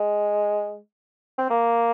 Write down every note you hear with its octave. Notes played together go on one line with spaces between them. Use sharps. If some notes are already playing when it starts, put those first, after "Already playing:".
Already playing: G#3
C4
A#3